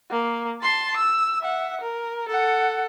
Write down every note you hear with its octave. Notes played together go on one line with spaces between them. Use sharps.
A#3
A5 C6
E6
E5 F#5
A#4
A4 F#5